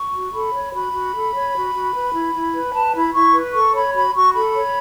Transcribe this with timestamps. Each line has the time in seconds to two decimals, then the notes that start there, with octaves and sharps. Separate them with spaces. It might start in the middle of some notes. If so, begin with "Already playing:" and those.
Already playing: C#6
0.13 F#4
0.33 A4 B5
0.53 C#5
0.73 F#4 B5
0.93 F#4
1.13 A4
1.33 C#5
1.54 F#4
1.74 F#4
1.93 B4
2.14 E4
2.34 E4
2.53 B4
2.74 B4 A5
2.94 E4 B5
3.14 E4 C#6
3.34 B4
3.54 A4 C#6
3.74 C#5 B5
3.94 F#4 B5
4.15 F#4 C#6
4.34 A4 B5
4.55 C#5